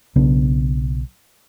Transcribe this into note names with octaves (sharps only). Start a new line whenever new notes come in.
B1 C#3 B3 D4